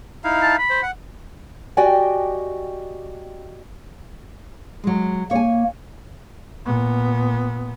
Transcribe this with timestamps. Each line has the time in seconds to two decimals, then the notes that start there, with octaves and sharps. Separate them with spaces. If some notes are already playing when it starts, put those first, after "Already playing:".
0.24 D#4 E4 F5
0.42 A5
0.58 B5
0.70 C5
0.82 F#5
1.77 F#4 G4 D5 D#5 G5 G#5
4.84 F#3 G#3
5.31 A#3 C#5 G#5
6.66 A#2 B3